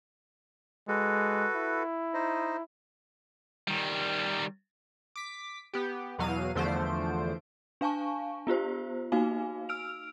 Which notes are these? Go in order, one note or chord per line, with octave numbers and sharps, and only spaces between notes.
G#3 F#4 A4 B4
E4
D#4 C5 D#5
D#3 G3
D6 B6
B3 G4
E2 B2 F#3 F5 D#7
E2 D3 F3 A3 C5 D7
D4 F5 G#5 A5 C#6
B3 F4 G4 C5
A#3 D#4 F#4 F5 G#5
E6 F6 D7 F7